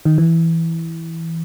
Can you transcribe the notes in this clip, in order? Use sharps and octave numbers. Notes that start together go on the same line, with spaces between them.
D#3
E3